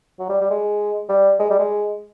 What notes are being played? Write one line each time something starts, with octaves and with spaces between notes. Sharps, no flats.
F#3
G3
G3
G#3
G3
G#3
G3
G#3